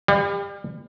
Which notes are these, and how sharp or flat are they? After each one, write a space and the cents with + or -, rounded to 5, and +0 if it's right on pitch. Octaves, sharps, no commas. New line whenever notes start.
G3 +30 F5 +0